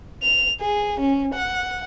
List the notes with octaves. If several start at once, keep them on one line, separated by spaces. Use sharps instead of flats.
F7
G#4
C#4
F#5